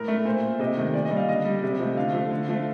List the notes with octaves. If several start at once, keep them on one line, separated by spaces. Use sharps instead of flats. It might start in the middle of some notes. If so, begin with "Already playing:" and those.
Already playing: A2 A#4
A3
A#2 C5
A3
C3 D#5
D#3 A3
A#2 D5
D#5
G3
F5
D3 D#5
G3
C3
F3 A3
D3 F5
F3 A3
D3
F3 A3